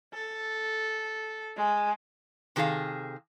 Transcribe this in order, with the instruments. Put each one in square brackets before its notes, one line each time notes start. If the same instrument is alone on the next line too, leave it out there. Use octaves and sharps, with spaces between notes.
[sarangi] A4
G#3
[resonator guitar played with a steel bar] C3 D#3 G#4 A4 F5